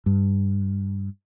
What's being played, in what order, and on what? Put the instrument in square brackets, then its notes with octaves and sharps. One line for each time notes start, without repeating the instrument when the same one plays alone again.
[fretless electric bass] G2